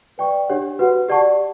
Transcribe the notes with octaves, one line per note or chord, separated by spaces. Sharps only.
B4 D5 G5 C#6
D4 G4 C#5 F#5
F#4 B4 F#5
G4 D5 F#5 A5 C#6